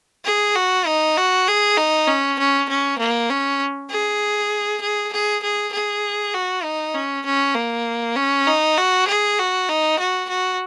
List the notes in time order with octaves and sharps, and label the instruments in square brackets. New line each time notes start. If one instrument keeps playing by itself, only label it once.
[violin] G#4
F#4
D#4
F#4
G#4
D#4
C#4
C#4
C#4
A#3
C#4
G#4
G#4
G#4
G#4
G#4
F#4
D#4
C#4
C#4
A#3
C#4
D#4
F#4
G#4
F#4
D#4
F#4
F#4